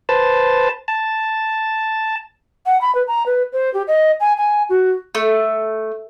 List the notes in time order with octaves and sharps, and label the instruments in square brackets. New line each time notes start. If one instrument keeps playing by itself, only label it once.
[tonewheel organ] B4 C5 A5
A5
[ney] F#5
B5
B4
A#5
B4
C5
G4
D#5
G#5
G#5
F#4
[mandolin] A3